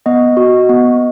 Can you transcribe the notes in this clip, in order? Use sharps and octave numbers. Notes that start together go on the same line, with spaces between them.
B3 D#5
F#4
B3